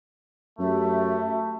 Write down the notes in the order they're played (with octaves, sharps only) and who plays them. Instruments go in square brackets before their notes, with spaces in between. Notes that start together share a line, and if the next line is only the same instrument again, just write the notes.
[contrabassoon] F#2 [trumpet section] A3 [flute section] F#4 G4 E5